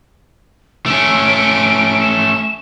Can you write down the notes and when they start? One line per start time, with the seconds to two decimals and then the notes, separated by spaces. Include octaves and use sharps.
0.86 A3 C#4 D7
2.01 E7